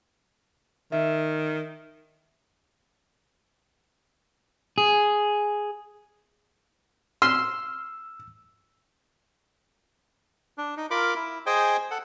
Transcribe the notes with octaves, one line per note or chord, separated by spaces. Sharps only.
D#3 E5
G#4
C6 E6 F6
D4
D#4
F4 A#4 B5 D6
E4
G#4 C5 D#5 G5 G#5
A4 F#5